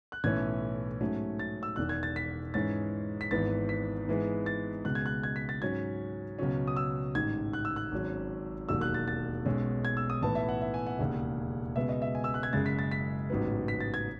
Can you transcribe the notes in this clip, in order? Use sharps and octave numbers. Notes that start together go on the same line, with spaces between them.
F#6
B1 A2 E3 A3 C#4 G#6
G#2 F#3 A3 C#4
A6
E6
E1 E2 D#3 F#6
G#6
A6
B6
G#2 E3 G#3 C#4 A6
B6
G#1 G#2 E3 B3 A6
B6
G#2 E3 G#3 B3
A6
C#2 B2 G#3 F#6
G#6
F#6
G#6
B6
A6
G#2 F#3 C#4 G#6
C#2 B2 F#3 C#4
D#6
E6
A1 G#2 D#3 G#6
F#6
E6
F#6
G#1 G#2 F#3 C#4
E1 D#2 D#3 F#3 E6
F#6
A6
A6
B1 B2 G#3 C#4
G#6
E6
D#6
B1 A2 E3 B3 A5
E5
F#5
E5
G#5
F#5
E1 D#2 C#3
C#2 B2 G#3 B3 E5
D#5
E5
G#5
E6
F#6
G#6
F#1 F#2 C#3 G#3 A6
B6
A6
B6
A1 G#2 F#3 B3
B6
A6
G#6